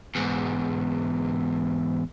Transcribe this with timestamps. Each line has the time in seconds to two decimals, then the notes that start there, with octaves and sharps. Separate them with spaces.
0.16 E2 G#2